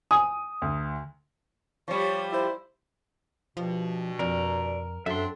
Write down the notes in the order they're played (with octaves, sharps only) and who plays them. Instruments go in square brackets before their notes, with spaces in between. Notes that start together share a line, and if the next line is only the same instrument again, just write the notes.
[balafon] G#5 [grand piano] D#6
[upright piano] D2
[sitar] F3 G3 [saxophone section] C#5
[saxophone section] E4 C5
[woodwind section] G2 B2 [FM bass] F3
[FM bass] F2 [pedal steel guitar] A#4 [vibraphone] D5
[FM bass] F#2 [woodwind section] F#3 C4 D4 [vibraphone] A4 [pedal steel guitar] E5 C6